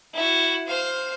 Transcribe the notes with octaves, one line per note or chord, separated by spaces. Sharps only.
E4 F#4
C5 F5